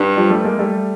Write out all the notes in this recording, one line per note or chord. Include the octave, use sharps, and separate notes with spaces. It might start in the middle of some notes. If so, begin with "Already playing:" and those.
Already playing: G2
F3 G3
G3 A3
G#3 A#3
G3 A3